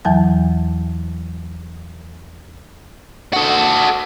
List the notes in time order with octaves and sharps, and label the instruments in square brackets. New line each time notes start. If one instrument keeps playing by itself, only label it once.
[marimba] E2 E3 F#3 A5
[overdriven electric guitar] F#4 A4